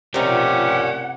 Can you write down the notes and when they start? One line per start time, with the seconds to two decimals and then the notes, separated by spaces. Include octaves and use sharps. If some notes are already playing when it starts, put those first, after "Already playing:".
0.14 C3 F3 C#4 D#4 G4 A#4 D5 F#5